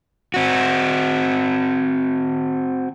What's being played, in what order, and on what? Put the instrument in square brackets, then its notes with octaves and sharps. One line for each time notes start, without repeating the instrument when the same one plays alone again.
[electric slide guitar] C4 F#4